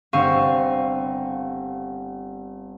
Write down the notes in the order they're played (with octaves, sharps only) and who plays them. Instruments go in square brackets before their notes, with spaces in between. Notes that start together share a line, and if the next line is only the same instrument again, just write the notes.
[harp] G1 C4 F5 C#6 D#7